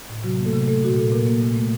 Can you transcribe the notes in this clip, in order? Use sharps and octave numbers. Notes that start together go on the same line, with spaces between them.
A2
C3 F#3 F#4
A#3
A3 A4
C3
A3 A4
A#2 F#4
A#2 A4
A#2 A#3 A#4
A#3
A#2
A3